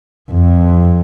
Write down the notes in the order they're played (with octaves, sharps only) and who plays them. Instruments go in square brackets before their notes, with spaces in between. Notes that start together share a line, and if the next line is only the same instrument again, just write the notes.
[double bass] F2